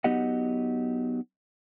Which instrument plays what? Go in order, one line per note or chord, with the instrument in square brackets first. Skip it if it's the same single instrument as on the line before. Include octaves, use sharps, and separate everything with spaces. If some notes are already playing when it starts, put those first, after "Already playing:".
[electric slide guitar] F#3 B3 D#4 G4 D#5 F#5